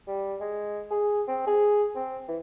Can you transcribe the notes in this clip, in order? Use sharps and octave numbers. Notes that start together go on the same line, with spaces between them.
G3
G#3
G#4
C4
G#4
C4
E3